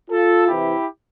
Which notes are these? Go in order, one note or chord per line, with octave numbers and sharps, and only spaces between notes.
F4 A4
C3 E3 E4 G4